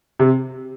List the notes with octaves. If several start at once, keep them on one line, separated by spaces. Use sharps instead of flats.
C3